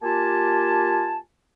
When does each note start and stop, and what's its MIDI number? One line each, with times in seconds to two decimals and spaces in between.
0.03 1.19 58
0.03 1.19 65
0.03 1.19 67
0.03 1.19 80
0.03 1.19 81